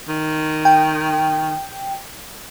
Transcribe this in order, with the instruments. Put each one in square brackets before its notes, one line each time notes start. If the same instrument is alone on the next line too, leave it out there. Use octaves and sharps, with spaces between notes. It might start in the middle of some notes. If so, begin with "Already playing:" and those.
[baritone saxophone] D#3
[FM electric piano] G5